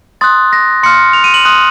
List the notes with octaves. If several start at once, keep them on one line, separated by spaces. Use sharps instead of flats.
C6 D#6 F#6 A6
A#6
C6 F6 C#7
F7
D#7
F#7
C6 D#6 F#6